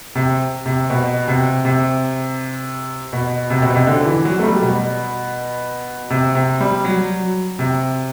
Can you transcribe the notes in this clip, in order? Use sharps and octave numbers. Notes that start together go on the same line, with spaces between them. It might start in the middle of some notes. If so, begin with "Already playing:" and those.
C3
C3
B2
C3
C3
B2
C3
B2
C3
D3
E3
F#3
A3
G3
B2
C3
C3
G3
F#3
C3